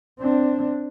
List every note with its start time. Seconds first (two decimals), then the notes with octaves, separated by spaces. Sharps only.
0.19 C4 D4